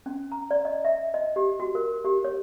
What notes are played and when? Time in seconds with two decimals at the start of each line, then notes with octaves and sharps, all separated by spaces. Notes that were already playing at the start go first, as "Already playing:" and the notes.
0.06 C#4
0.32 A#5
0.51 D5
0.65 D#5
0.84 E5
1.14 D#5
1.36 G4
1.60 F#4
1.75 A#4
2.05 G4
2.24 C#5